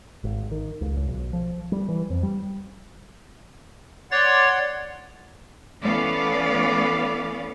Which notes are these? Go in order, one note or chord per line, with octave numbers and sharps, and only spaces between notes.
G#1
D#3
C#2
C#2
B1
F3
G3
E3
F2
G3
C#5 D5 F#5 C6 A6
E3 A3 B3 C#4 D5 F5